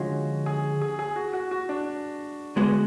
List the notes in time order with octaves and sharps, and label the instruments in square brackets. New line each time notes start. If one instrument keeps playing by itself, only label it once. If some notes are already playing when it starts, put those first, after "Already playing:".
Already playing: [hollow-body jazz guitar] D3 F3 G#3 C#4 F4 [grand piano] F#4
[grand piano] G#4
G#4
G#4
F#4
F#4
F#4
D4
[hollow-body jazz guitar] D3 G#3 B3 F#4